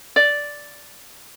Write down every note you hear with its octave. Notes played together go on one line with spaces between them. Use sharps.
D5